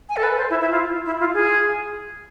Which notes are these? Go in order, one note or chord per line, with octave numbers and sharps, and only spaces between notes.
G#5
A4
B4
C5
E4
E4
F4
E4
F4
G#4